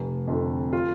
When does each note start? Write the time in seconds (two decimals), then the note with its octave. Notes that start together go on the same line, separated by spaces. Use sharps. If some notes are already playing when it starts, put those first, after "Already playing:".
Already playing: F1
0.27 F2 D3
0.73 F4